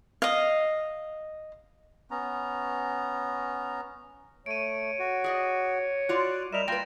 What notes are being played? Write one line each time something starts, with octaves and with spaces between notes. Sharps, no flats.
D#5 F5
B3 C#4 A#5
A3 C#5 D7 D#7
F#4
G#4 D5 D#5
F4 F#4 D5 F#6
G3 A#4 D#5 E5 E7 F7
A#3 F4 B4 G5 A#6